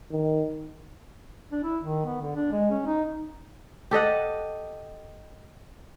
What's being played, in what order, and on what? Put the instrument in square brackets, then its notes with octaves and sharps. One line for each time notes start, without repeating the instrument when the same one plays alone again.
[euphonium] D#3
[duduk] D4
E4
D#3
B3
D3
D4
G#3
C#4
D#4
[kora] G4 A4 D#5 F#5